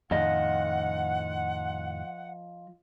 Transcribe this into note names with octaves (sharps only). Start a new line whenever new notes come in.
F2 A2 D#3 F3 D#5 F#5